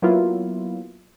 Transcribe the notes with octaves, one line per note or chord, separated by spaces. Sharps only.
F#3 A#3 B3 E4 F4